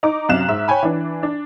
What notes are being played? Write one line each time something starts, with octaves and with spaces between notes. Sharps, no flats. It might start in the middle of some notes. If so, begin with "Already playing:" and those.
D#4 D6
F#2 C3 F5 F#6 E7
G#2 E5 E7
C#5 G5 G#5 B5
E3 D4
D4